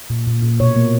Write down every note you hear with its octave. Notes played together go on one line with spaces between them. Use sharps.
A#2
A#2
A#2
B2 C#5
A#3